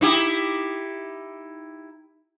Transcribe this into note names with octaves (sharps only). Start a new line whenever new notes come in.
D#4 E4 G4